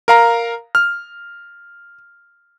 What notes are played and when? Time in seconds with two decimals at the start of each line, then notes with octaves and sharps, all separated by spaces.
0.08 A#4 F5 A#5
0.75 F6